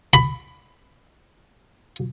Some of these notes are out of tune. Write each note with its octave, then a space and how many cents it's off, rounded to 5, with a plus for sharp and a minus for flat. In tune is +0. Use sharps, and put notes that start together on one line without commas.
B5 +10